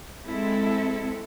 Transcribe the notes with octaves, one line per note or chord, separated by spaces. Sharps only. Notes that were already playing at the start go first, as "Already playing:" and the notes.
G#3 C4 E4 A4